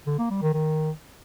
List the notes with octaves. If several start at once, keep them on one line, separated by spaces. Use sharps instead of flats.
D3
A#3
G3
D#3
D#3